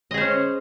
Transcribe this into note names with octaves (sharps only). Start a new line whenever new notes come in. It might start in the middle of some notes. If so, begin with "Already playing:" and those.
C#4 G#4 C5 D#5